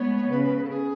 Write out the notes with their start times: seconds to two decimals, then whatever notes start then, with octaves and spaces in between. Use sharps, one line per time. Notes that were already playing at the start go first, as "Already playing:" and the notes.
Already playing: G#3 B3 C#5
0.30 C#3 B4
0.44 B4
0.57 B4
0.64 A4
0.70 G#4